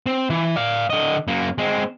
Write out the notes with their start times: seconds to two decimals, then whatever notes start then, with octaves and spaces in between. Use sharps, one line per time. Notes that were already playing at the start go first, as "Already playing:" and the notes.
0.06 C4
0.30 E3
0.56 D5 F5
0.90 D3 D#5
1.28 F#2 A#3
1.58 G#3 C4